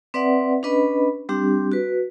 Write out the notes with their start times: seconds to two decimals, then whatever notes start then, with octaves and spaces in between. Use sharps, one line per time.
0.14 C4 B4 D5 E5 F#5
0.63 C#4 D4 B4 D#5 B5
1.29 G3 C4 D4 G4
1.72 F#4 B4